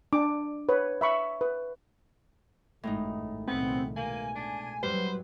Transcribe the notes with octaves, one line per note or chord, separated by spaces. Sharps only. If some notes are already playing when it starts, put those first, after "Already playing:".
D4 D6
B4 C#5
E5 B5 C#6
B4
G#1 F#2 A2 G#3 D#4
C2 A#2 D#3 B3 C4
B2 A#3 G#5
D4
F#2 A2 F#3 G3 B4 C5